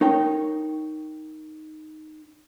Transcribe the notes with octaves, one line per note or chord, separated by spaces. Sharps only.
D#4 A#4 C#5 G5